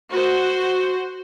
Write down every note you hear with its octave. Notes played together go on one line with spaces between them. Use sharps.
F#4 C5